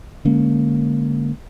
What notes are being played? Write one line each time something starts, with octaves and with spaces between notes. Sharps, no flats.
D3 G#3 A#3 C#4